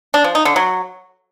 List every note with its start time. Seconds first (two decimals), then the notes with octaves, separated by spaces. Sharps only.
0.14 D4
0.24 F3
0.35 D#4
0.45 D3
0.56 F#3